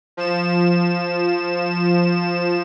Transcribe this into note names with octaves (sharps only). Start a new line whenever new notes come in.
F3 E7